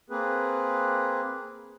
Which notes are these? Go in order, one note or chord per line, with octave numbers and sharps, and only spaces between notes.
A#3 C4 G#4 B4